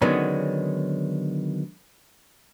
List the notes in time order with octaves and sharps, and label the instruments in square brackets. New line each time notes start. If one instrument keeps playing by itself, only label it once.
[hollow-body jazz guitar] D3 D#3 F#3 G#3 B3 C#4